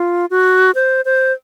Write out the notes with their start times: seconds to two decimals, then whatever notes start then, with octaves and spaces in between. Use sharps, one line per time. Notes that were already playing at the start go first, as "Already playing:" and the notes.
Already playing: F4
0.31 F#4
0.75 C5
1.05 C5